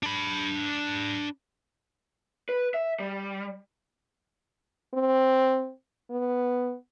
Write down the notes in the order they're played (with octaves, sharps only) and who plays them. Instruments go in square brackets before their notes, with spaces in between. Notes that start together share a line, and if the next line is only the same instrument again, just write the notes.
[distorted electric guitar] D4 B5
[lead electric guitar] B4
E5
G3
[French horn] C4
B3